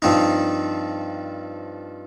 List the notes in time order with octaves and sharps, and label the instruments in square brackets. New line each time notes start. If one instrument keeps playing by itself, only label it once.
[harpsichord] G2 F3 C4 D#4